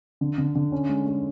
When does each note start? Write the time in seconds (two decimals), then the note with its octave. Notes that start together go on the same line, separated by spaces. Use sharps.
0.21 D3
0.38 D3
0.55 D3
0.72 C#4
0.89 G#3
1.06 G#3